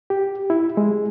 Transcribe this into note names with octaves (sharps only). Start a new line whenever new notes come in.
G4
E4
G#3